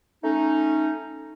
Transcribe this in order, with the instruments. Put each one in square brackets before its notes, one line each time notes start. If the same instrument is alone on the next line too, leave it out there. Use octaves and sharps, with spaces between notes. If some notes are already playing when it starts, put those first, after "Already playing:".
[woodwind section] A3 C#4 D#4